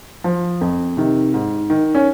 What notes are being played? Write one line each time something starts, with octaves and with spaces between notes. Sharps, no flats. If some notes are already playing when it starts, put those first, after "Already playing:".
F3
F2
C3 D#3
G#2
D#3
C#4